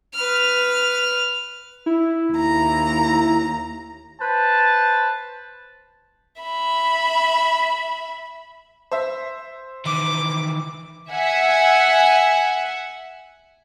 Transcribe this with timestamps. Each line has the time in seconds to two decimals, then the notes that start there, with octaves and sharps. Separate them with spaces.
0.15 B4 F6
1.86 E4
2.33 D#2 A#5
4.21 B4 C5 A5
6.41 E5 B5
8.91 C5 E5
9.86 D#3 E3 D6
11.11 E5 F#5 G#5